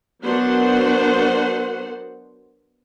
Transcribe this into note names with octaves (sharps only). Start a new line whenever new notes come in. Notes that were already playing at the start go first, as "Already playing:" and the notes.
F#3 B3 D4 A#4 C5 F#5